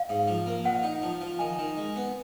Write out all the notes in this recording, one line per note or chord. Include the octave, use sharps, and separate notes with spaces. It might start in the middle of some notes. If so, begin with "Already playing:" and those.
Already playing: F5
G#2
F3
A#3
A#2 F#5
D#4
F3
F3
D#3 G#5
D#3
G#3
B3